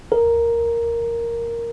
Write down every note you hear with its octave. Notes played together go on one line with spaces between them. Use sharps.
A#4